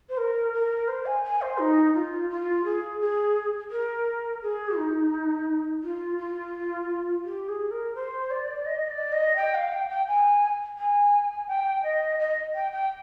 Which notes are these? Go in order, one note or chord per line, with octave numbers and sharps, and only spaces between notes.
C5
A#4
A#4
C5
G#5
G#5
C5
D#4
F4
F4
G#4
G#4
A#4
G#4
D#4
F4
F4
G4
G#4
A#4
C5
D5
D#5
D5
D#5
G5
F5
G5
G5
G#5
G#5
G5
D#5
D#5
G5
G5